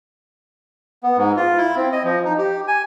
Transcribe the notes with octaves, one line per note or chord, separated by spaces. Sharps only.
B3
G#2
F4
E4
C4
D#5
F3
D#4
G4
G#5